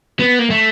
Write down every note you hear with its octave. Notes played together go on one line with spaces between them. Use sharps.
B3
A#3
A3